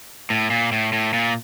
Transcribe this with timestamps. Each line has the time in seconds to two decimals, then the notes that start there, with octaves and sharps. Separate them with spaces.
0.30 A2
0.50 A#2
0.72 A2
0.93 A2
1.13 A#2